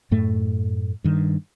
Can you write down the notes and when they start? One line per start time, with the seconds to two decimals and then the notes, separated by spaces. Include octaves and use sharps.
0.11 F#2 A2 A3
1.04 G2 D#3